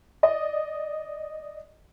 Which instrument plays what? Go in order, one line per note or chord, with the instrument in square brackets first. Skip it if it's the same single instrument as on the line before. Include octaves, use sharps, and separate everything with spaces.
[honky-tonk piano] D5 D#5